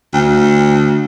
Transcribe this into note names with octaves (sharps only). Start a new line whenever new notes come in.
D2